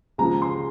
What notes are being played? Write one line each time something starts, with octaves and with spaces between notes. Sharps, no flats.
C#2 C#3 F3 A#5
C6